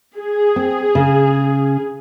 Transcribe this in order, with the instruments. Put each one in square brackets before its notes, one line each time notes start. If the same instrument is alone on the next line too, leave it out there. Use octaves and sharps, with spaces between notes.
[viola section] G#4
[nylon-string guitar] C4
C#3